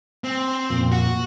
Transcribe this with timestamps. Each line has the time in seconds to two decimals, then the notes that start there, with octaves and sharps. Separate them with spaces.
0.24 C4
0.70 F2 A#2
0.92 F#4